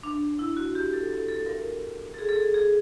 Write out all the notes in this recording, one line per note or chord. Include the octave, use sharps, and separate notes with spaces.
D4
E4
F#4
G4
A4
A4
A4
A#4
A4
G#4
A4
G#4
G#4